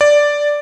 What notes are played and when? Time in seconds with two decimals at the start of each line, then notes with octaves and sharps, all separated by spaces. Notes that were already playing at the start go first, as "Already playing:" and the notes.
0.01 D5